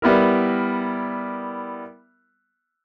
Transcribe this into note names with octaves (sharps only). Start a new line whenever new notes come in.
G3 B3 E4 A#4